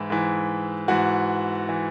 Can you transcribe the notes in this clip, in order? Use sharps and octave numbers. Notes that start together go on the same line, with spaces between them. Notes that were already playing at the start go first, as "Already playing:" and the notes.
Already playing: G#2 E3 E4
G#2 E3
G#2 E3 F#4
E3